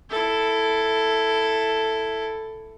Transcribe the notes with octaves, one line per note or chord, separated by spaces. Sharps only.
E4 A4